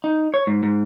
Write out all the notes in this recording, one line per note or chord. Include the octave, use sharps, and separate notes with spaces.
D#4
C#5
G#2
G#2